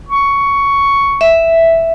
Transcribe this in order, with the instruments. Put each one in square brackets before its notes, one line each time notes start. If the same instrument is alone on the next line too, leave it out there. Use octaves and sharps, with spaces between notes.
[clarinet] C#6
[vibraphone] E5